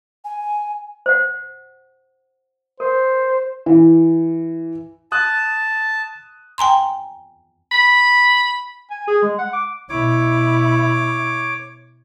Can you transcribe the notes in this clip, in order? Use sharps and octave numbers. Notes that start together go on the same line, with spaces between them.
G#5
C5 F#5
A#4 C5
E3
A5 D#6 F#6
G5 G#5 A#5 C6
B5
G#5
G#4
G#3
F#5
D6
B2 E4 C#5 D6